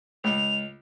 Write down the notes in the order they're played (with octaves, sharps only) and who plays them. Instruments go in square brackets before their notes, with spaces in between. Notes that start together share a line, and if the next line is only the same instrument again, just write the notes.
[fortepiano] C#2 [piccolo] F7